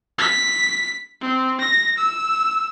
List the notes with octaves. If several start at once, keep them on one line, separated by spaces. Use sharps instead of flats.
B6
C4
A#6
E6